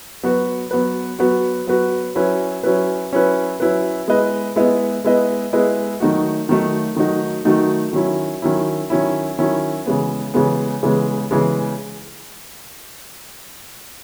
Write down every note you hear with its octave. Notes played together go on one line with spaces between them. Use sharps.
F#3 B3 F#4 B4
F#3 B3 F#4 B4
F#3 B3 F#4 B4
F#3 B3 F#4 B4
F#3 C#4 E4 B4
F#3 C#4 E4 B4
F#3 C#4 E4 B4
F#3 C#4 E4 B4
G#3 B3 E4 B4 D#5
G#3 B3 E4 B4 D#5
G#3 B3 E4 B4 D#5
G#3 B3 E4 B4 D#5
D#3 F#3 A3 D#4 F#4
D#3 F#3 A3 D#4 F#4
D#3 F#3 A3 D#4 F#4
D#3 F#3 A3 D#4 F#4
D#3 F#3 C#4 E4
D#3 F#3 C#4 E4
D#3 F#3 C#4 E4
D#3 F#3 C#4 E4
C#3 E3 G#3 B3
C#3 E3 G#3 B3
C#3 E3 G#3 B3
C#3 E3 G#3 B3